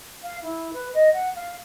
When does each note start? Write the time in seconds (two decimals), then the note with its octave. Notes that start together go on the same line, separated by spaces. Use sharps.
0.23 F5
0.42 E4
0.73 B4
0.94 D#5
1.13 F#5
1.35 F5